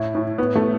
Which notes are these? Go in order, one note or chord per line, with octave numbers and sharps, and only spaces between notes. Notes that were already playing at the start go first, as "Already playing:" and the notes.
Already playing: A2 E4
A2
A2 B3
A3